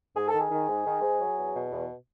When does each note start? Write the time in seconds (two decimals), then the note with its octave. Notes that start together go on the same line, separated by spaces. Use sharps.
0.16 G#2 G#4
0.28 A4
0.34 D#3 G#4
0.51 D#3
0.69 G#2
0.86 D#3
1.02 G#2
1.20 F#3
1.37 E2
1.54 B2
1.72 E2